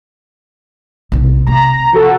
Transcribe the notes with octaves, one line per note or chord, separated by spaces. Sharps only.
B1 C3
C3 C4 A#5
F3 F#4 A4